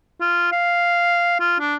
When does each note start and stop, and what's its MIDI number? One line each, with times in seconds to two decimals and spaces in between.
0.21 0.50 65
0.52 1.37 77
1.40 1.56 65
1.60 1.75 62